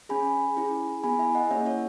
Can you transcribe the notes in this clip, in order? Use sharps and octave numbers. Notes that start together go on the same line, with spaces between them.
C#4 G#4 G#5 B5
C#4 E4 G#4
B3 E4 G#4 G#5 B5
E5 G#5
D#5 F#5
A#3 C#4 E4 G#4 C#5 E5
C#5 E5